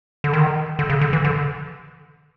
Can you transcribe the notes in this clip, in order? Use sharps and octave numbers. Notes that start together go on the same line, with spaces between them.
D3
D#3
D3
C#3
D3
E3
D3